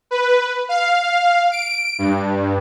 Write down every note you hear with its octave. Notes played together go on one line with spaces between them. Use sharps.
B4
F5
D7
G2